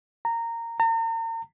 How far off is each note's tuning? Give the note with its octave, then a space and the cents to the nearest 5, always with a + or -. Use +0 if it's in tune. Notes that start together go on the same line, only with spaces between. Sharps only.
A#5 -15
A#5 -40